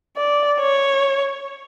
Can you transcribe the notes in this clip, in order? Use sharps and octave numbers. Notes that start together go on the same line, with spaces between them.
D5
C#5